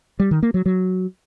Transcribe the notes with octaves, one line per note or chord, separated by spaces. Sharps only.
G3
D#3
A#3
F#3
F#3